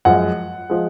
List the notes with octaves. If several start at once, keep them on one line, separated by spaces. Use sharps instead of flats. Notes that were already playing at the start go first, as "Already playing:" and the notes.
F#2 F3 G#3 F#5
F3 G#3